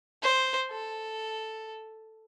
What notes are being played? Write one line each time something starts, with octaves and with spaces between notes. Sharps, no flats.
C5
A4